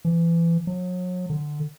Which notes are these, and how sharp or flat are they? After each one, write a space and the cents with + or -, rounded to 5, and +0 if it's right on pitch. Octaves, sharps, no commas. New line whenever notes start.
E3 +30
F#3 -35
D3 +15